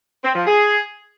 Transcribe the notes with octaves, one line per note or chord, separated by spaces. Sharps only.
C4
F3
G#4